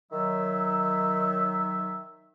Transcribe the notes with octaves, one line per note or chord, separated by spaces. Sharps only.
D#3 F#3 E5